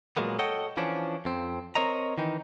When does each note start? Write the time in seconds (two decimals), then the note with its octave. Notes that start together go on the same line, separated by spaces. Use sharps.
0.17 A#2 F#3 G#3 A#3 B3
0.39 A4 C#5 D#5 F#5 G5
0.77 E3 F3 C#4 D4
1.25 F2 C4
1.75 C4 A#4 C#5 D#5 A#5
2.18 D#3 E3 D#4